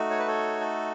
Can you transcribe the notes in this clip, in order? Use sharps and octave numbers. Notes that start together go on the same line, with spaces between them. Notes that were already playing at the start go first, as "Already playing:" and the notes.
Already playing: A3 D#4 F#4
C#5
B4
A4 C#5
A4